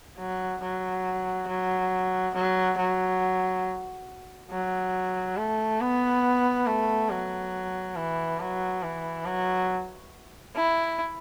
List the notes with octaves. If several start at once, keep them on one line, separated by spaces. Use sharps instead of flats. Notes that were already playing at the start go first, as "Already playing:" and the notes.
F#3
F#3
F#3
F#3
F#3
F#3
A3
B3
A3
F#3
E3
F#3
E3
F#3
E4